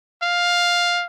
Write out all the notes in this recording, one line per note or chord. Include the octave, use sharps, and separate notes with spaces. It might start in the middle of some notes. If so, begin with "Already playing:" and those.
F5